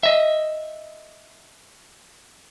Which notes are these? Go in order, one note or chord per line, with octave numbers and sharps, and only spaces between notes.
D#5 E5